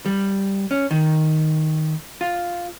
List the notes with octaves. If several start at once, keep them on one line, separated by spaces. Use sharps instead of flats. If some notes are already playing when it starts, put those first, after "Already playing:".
G3
C#4
D#3
F4